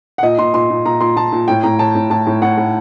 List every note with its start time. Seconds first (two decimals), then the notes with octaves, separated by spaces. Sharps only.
0.18 F#5
0.23 A#2 D#5
0.38 A#2 C6
0.54 A#2 C6
0.70 A#2
0.85 A#2 A#5
1.01 A#2 C6
1.16 A#2 A5
1.32 A#2
1.48 A2 G5
1.63 A2 A#5
1.79 A2 A5
1.95 A2
2.10 A2 A5
2.27 A2
2.42 A2 F#5
2.57 A2